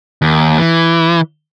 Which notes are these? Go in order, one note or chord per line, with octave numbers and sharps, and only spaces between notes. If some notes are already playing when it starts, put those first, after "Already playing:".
D#2
E3